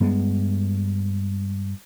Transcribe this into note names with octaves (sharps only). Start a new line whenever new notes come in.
G2 G3 G#3 B3